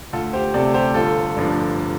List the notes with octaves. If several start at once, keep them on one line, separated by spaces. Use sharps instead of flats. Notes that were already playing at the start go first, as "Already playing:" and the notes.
D2 F4 A4
G4 C5
C3 A3 A4 D5
G4 C5
G1 F4 A4
G2 F3 D4